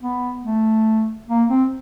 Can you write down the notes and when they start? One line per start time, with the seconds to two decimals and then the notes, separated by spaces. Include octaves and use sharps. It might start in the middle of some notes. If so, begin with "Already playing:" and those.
0.02 B3
0.44 A3
1.29 A#3
1.50 C4